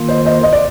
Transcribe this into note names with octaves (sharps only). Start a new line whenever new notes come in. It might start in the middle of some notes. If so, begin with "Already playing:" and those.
Already playing: D#3 A#3 F4
C5 D#5
C5 D#5
D#5
D5